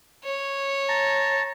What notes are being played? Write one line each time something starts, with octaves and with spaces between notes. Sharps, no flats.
C#5
A5 A#5